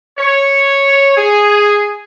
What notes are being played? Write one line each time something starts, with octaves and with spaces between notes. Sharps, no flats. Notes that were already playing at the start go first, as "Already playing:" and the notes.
C#5
G#4